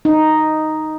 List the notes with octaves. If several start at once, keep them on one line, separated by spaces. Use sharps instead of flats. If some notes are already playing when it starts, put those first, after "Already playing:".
D#4